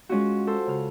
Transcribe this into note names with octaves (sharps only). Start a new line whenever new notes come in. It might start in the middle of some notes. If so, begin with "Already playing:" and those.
G#3 C#4 F4 F#4
A4 C5
C#3 F6